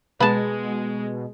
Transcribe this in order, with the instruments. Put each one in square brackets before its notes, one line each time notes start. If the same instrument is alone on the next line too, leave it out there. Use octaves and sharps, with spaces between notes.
[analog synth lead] B2 [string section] G#3 [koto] B3 A5